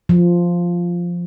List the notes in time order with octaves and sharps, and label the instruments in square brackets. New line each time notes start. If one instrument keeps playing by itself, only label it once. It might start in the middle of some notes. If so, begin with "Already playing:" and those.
[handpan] F3